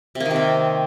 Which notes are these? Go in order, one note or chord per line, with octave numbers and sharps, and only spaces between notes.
C3
A#3
D#3
C3
C4